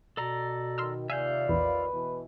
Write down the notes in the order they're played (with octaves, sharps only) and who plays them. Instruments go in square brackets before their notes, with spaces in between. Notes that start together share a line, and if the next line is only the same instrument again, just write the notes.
[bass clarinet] B2 [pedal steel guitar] A4 D5 A#5
[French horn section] D#3 [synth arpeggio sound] C6 E6 F6
[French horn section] D#2 F4 D5 [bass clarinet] C3 [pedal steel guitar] E5 F5 G6 [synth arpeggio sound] G#5
[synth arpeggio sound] A#1 E2 [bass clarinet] B4
[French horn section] B2 E3